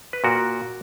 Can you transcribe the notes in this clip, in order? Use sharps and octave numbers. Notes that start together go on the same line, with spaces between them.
B4
A#2 F#4 A#4